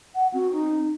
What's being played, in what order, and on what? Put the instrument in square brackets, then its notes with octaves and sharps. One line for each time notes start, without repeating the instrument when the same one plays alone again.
[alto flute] F#5
[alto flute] C4 [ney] F#4
[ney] D#4